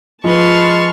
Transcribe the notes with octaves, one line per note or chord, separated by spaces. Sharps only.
F3 G#3 B4 A5 C6 C#6 F6